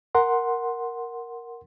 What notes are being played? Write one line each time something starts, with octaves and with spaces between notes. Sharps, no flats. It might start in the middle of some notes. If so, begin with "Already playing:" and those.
A#4 F#5 C6